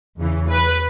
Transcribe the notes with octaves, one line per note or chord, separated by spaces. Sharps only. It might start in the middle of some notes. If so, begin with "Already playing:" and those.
E2 C#3 E3
B4